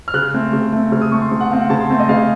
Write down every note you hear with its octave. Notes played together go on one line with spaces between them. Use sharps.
F6
C#3 F#6
A3 C4
C#3
A3 C4
C#3 F6
D#6
A3 C4 C#6
C6
C#3
F#5
A3 C4 F5
F#5
C#3 A5
C6
A3 C4
D#5
C#3 F5